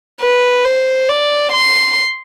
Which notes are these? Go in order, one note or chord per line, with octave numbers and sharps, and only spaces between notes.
B4
C5
D5
C6